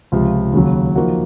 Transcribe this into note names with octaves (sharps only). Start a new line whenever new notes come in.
C#2 C3 F3
D#2 C#3 F#3
F3 A#3 D#4 F#4